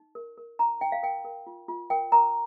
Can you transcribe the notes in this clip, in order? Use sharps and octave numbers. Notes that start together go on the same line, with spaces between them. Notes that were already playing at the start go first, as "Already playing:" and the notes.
Already playing: D#4
A#4
A#4
D#4 A#5
D#4 G5
F5
A#4 G5
A#4
F4
F4
A#4 G5
A#4 A#5